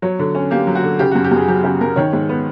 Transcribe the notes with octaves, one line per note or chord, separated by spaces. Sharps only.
F#3 C#5
D3
C#4
A#3 G4
F#3
F#4
D3
C#3 G4
F#4
F#2
G4
F#2 G#4
F#3 G4
C#3 G4
F#2 A#4
D#3 C#5
G#2
B3